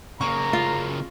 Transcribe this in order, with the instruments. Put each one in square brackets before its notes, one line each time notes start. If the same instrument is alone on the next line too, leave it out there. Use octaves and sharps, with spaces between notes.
[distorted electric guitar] C#3 A#3 [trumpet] A#5 [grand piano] C#6
[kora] F4